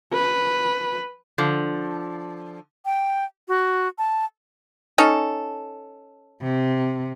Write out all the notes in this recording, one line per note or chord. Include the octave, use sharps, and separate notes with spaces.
B4
D3 F3
G5
F#4
A5
C#4 D#4 A4
C3